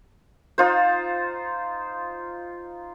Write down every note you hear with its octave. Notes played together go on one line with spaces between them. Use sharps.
D#4 F4 C5